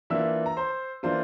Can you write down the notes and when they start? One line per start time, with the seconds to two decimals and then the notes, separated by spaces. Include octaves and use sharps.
0.10 E3 A#3 D4 F4 E5 E6
0.46 A#5
0.57 C5 C6
1.03 E3 A#3 D4 F4 C5 C6